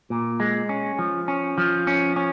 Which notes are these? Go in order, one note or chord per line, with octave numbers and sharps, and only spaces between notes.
A#2
G#3
C#4
F3
C#4
F3
C#4
C#4